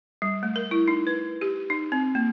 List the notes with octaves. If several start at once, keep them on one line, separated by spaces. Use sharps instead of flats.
G3
A3
A#4
E4
D#4
B4
G4
D#4
C4
A#3